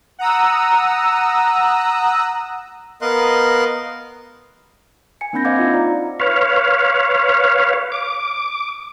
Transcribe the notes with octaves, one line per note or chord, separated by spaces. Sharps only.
F#5 A#5 D#6 E6
B3 A#4 D#5 F5 C6 F#6
G#5 C#7
A#3 C4 D4 B5 G6 A#6
C5 D#5 F5 F#5 D6 G#6
D#4 F4 E5
D5 A#5
B4 C#5 F5
D6